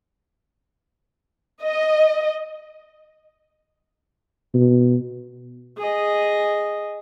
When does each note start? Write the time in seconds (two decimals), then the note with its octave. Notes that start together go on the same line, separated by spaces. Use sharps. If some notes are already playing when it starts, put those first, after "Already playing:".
1.63 D#5
4.54 B2
5.77 G#4 D#5